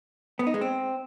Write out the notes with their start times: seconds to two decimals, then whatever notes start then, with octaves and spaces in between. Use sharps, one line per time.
0.39 B3
0.47 D#4
0.54 G#3
0.61 C4